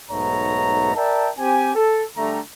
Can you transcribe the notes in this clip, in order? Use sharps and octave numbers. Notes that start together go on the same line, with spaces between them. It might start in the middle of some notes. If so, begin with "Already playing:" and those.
B1 G#2 A3 B3 C#5 A#5
A#4 D5 E5 G5 A5
C4 G4 G#5
A4
D3 G3 A3 A#5